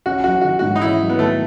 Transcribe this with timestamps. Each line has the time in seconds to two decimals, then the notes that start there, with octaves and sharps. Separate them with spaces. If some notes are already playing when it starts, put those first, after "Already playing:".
0.06 C#4 F#4
0.24 F#3 F#4
0.41 D#3 F#4
0.59 F#4
0.62 G#2
0.75 D#4
0.81 C#4 E4
1.01 F#3
1.10 B3
1.19 D#3 A3